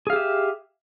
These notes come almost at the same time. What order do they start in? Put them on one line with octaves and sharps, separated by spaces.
G#4 F5 G4 E5